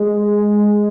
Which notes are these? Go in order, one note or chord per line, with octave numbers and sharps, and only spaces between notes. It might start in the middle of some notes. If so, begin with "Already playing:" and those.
Already playing: G#3